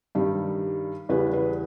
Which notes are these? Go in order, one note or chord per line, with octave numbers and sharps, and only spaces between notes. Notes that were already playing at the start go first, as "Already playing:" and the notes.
G2 D#3 G3
E2 C#3 G3 B4
B4